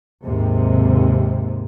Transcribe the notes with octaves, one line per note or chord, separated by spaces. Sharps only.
D#2 G#2 C3